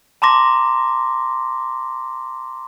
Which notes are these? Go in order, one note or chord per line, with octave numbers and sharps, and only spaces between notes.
A5 A#5 C6 D6 A#6